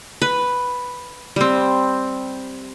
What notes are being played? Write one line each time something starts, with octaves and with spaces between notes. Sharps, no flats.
B4
G3 C4